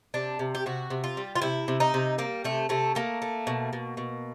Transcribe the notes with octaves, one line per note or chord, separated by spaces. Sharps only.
C3 D4
C3
G4
C3 F#4
C3
F4
G3
F4
C3 E4
C3
D#4
C3
G3 A#3
C3 A3
C3 A3
A3 A#3
A3
B2
B2
B2